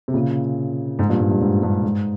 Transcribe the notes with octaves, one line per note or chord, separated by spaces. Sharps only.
C3
A#2 C#3
G#2
G2 A#2
G#2
G2
G#2
G2
G#2